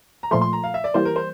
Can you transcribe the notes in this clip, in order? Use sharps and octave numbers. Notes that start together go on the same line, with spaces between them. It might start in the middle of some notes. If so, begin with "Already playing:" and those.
A#5
A#2 F3 A3 C6
C6
A#5
F5
E5
D5
E3 G3 A#3 C5
A#4
C5